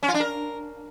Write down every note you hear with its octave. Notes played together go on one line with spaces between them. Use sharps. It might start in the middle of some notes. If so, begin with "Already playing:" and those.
C#4
F4
D4
A#4